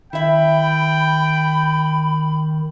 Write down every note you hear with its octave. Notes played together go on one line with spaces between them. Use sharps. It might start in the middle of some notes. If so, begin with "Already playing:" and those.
D#3 E4 E5 G5 B5